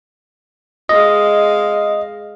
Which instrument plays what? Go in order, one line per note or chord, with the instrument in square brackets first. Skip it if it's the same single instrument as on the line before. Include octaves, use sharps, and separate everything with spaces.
[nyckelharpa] G#3 F5 [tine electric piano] D#5